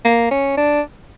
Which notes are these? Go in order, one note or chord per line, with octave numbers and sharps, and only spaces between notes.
A#3
C#4
D4